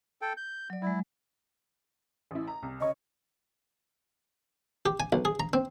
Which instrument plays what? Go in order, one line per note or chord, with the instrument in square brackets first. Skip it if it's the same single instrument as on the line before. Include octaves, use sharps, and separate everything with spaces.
[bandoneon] A4 G5
G6
[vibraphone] F#3 D5
[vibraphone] F#3 G#3 [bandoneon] E4
[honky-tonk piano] A1 E4
A#5
C2
[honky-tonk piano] C#3 C#5 C#6 [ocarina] D#5
[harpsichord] G4
G#5
B1
G#4
A#5
C4